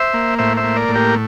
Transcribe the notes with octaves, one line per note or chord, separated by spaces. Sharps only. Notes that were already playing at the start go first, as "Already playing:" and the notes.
Already playing: C5 E5
A#3
A2 C5 E5
C5 E5
A#3
A#4 D5
A2
G4 A#4